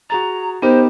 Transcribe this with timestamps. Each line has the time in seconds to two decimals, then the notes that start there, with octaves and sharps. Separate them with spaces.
0.10 F#4 G#4 A#5 A6
0.62 B3 D#4 G4 A#4 C5